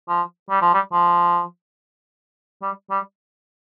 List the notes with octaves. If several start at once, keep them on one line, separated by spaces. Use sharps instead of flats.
F3
G3
F3
G3
F3
G3
G3